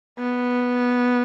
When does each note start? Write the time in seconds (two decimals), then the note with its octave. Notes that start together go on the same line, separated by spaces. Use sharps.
0.18 B3